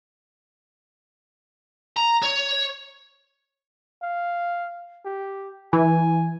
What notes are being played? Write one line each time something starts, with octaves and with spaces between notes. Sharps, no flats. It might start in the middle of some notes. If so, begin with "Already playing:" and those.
A#5
C#5
F5
G4
E3 G#5